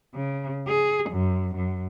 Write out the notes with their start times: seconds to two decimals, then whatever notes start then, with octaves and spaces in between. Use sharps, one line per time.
0.13 C#3
0.67 G#4
1.09 F#2
1.55 F#2